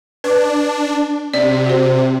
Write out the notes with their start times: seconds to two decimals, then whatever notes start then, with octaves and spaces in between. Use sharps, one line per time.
0.24 D4 B4
1.34 C3 D5
1.66 F#4 C5